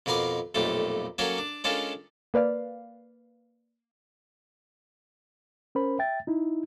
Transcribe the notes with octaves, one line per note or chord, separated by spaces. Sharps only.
F2 B2 A#4 B4 C6 D6
B1 F2 A#2 A3 G4
F#3 A#3 C#4 F#4 A4 A#4
D4
G#3 C#4 D4 F4 A4 A#4
A#3 B4 D5 F5
C#4 A#4 C5 B5
E5 G5 A6
D#4 E4